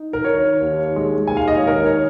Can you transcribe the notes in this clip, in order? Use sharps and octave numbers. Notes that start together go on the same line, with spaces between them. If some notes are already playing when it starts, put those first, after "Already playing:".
Already playing: D#4
A#4
D#3 C#5
D#2
G#3
D#2 G#5
F5
D#5
C#5
D#3 A#4
C#5